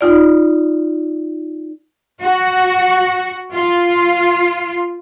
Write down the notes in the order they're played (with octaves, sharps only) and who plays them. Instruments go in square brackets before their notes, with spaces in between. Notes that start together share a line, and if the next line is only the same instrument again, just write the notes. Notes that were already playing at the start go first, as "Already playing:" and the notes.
[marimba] D#4 F4 D5
[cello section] F#4
F4